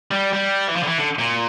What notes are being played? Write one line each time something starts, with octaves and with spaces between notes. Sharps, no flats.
G3
G3
E3
F3
D3
E3
D3
A#2